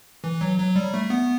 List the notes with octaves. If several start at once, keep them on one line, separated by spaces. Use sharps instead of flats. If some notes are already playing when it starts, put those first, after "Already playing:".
E3
F#3
F#3
G3
A3
B3